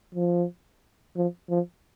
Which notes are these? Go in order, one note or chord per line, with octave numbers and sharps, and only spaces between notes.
F3
F3
F3